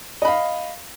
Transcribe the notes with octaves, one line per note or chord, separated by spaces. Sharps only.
D#5 F5 B5